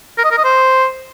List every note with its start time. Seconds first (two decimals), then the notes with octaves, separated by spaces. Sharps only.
0.18 A#4
0.24 D#5
0.31 A#4
0.38 D#5
0.44 C5